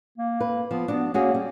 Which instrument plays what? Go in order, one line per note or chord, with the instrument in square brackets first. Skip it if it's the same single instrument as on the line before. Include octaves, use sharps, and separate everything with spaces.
[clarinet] A#3
[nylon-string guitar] B4
[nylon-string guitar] F3 [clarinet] B3
[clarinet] B3 [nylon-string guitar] D4 F#4
[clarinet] A#3 [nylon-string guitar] C#4 F#4 G#4
[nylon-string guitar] G3